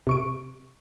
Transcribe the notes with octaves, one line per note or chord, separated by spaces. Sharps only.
C3 C#6 D7